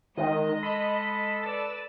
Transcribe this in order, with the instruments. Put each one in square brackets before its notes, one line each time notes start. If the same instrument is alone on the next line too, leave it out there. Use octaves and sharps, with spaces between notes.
[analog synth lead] D#3 [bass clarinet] G#3 [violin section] D#5
[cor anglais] A4 [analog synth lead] B5
[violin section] B4 D5 E6 [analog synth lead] A6